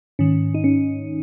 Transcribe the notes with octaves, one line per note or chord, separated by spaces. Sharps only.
G#2 D#3 C#4
D#4
C#4